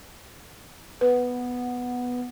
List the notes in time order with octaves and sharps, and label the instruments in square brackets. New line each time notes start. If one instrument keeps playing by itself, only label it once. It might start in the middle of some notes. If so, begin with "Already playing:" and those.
[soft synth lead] B3 [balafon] B4